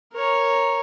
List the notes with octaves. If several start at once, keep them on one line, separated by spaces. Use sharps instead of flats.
A#4 C#5